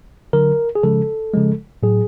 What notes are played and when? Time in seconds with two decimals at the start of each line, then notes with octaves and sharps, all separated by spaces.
0.33 D3 F#3 A#4
0.75 G#4
0.83 C#3 F3 G#3 A4
1.34 C#3 F3 G#3
1.83 A2 F#3 G#4